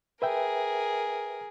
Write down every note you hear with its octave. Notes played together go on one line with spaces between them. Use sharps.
G#4 A#4 B4 E5 G5